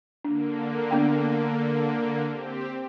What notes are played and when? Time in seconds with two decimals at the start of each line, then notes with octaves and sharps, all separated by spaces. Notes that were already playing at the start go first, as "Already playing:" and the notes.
0.25 D3 A#3 D4
0.91 B3 D4 G5
2.29 C4 G4